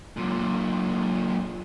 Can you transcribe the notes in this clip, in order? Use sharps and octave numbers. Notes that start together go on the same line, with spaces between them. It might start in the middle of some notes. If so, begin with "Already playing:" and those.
F#2 A#2